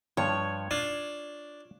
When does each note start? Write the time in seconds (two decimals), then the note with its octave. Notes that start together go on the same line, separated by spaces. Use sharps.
0.17 G2 F3 C#5
0.71 D4 F4